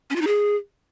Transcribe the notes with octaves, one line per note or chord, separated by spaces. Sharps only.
C#4
F4
D#4
G#4